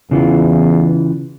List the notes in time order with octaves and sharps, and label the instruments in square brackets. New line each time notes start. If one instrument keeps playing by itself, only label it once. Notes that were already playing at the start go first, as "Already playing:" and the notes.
[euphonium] E2 [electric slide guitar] C#3 E3 F4